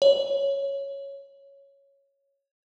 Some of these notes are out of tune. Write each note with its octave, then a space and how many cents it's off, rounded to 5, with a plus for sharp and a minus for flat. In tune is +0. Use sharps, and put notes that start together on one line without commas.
C#5 +0